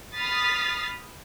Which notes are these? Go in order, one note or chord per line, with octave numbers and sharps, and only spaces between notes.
B5 D#6 F6 A6 B6 C7